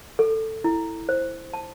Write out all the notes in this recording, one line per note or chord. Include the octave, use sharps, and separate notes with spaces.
A4
E4
C5
A5